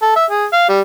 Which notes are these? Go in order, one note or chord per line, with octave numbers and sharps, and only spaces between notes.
A4
E5
G#4
F5
G3